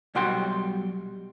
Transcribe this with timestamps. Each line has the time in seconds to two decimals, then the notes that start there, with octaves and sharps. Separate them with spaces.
0.15 B1 G3 F#4 F#5 G5 C6